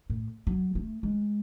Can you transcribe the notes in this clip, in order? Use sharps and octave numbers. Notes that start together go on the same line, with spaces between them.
A2
F#3
A3
G#3